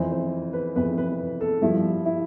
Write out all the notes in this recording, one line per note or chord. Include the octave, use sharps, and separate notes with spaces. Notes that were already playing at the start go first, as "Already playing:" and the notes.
Already playing: F2 E3 C5
C5
B4
F2 E3 B4
B4
A4
G2 F3 E4
E4